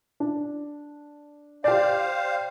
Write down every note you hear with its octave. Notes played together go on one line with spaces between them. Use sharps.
D4
G4 C5 D5 F5